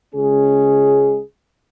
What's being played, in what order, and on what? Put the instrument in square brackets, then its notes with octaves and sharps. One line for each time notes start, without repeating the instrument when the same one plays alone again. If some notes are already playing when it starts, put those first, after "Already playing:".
[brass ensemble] C#2 C#3 G#3 C#4 G#4